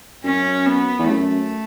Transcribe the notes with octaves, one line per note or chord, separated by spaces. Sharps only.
F#2 C#4
B3
E2
F#2 A3